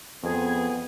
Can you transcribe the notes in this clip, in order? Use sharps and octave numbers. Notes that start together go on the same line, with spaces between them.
F2 B3 G#4